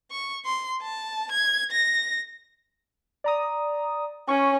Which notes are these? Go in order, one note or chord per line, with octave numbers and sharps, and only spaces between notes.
C#6
C6
A5
G#6
A#6
D5 A#5 D#6
C#4 C#6